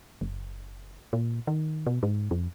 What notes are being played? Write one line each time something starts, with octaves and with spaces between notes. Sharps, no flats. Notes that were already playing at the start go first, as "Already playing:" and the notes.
F#1
A#2
D#3
B2
G#2
F2